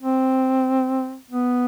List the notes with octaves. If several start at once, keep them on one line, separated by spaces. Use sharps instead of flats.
C4
B3